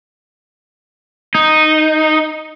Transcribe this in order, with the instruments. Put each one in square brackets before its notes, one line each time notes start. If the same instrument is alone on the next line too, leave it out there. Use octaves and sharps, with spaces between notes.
[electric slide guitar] D#4